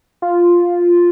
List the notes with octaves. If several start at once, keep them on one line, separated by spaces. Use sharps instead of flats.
F4